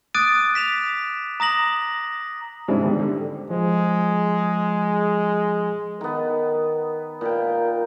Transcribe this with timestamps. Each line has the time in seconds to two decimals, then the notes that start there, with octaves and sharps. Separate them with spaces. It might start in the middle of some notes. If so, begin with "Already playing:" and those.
0.14 D6 D#6 F#6 A6 D7 D#7
0.55 B6 E7 F7
1.40 A#5 D#6 A#6 F#7
2.68 G#2 C#3 F#3 C4 D4 E4
2.83 G#2 D3 D#3 G3 B3
2.99 D3
3.50 F3 G#3
6.01 D#3 B3 A#4
7.21 A#2 A#4 B4 G5